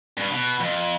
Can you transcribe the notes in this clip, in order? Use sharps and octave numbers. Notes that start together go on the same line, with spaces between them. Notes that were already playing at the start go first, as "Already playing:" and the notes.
G2
B2
F2